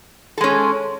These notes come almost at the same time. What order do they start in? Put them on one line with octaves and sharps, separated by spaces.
A4 G#3 C#4